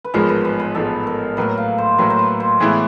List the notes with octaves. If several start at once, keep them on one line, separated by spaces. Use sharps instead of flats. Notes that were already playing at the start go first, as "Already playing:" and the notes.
B4
A1 G#2 F3 G#3 B3 A#4
B4
B4
B4
A1 G#2 F3 G#3 B3 A4
A#4
A2 F#3 A#3 B4
F5
C5
A2 F#3 A#3 B4
C5
B4
C5
A2 E3 G#3 B3 E4 C#5